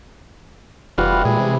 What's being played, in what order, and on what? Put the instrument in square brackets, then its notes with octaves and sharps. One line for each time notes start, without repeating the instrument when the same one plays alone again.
[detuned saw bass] F1 [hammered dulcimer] E3 G3 [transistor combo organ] F4 F#4
[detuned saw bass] A#2 [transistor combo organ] G#3
[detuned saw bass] C3